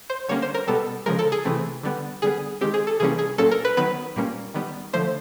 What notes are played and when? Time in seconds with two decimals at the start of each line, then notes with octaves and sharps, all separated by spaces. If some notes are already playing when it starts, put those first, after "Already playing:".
0.10 C5
0.29 D3 G3 A#3 C#4 C#5
0.42 C5
0.54 A#4
0.67 B2 G3 B3 A4
1.06 C#3 F3 G#3 A#4
1.19 A4
1.32 G#4
1.45 C3 E3 A3 C4
1.83 D3 G3 B3
2.22 D3 G3 B3 G#4
2.61 D#3 G#3 C4 G4
2.74 G#4
2.87 A4
3.00 C3 E3 G3 A#3 C#4 G#4
3.19 G#4
3.38 A#2 F#3 A#3 C#4 A4
3.51 A#4
3.65 B4
3.77 D#3 F#3 B3 B4
4.16 A#2 G3 A#3 C#4
4.54 D#3 G3 B3
4.93 D3 F3 A3 C5